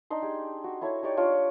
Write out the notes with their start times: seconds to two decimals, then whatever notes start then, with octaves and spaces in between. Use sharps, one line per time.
0.10 D4 D#4 C6
0.22 G4 G#4
0.64 F#4
0.81 E4 A4 C#5
1.03 D#4 G4 C#5 D5
1.17 D4 F4 C#5 D6